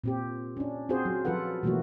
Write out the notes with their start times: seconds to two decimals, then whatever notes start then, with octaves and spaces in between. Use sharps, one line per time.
0.04 A#2 C4 G4
0.57 C#4 D4
0.89 C4 F4 F#4 G#4 C5
1.05 F#3
1.25 F3 F#3 F4 A4 B4 F#5
1.63 B2 E3 F#3 A3 A#3 F#4